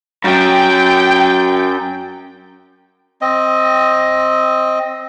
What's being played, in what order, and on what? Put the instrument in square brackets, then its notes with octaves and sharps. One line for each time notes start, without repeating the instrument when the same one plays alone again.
[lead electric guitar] F#2 F#3 [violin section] G5 G6
[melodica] C4 D#5